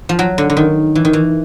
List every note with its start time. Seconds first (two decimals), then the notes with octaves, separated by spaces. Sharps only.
0.09 F3
0.19 F#3
0.38 D3
0.50 D3
0.57 D#3
0.95 E3
1.05 D#3
1.13 E3